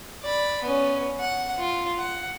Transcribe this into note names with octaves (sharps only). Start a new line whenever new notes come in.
D5 B5
B3 C#4
F#5
F4
F#5